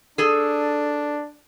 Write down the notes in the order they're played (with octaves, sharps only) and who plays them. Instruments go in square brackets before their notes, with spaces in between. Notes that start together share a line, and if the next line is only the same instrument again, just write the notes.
[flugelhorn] D4 [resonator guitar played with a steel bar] G#4 A4